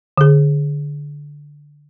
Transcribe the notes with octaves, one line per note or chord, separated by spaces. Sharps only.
D3 G#4